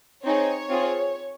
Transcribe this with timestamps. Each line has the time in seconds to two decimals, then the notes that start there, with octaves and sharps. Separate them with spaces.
0.24 C4 D#4 G#4 C#5
0.69 C4 F4 G#4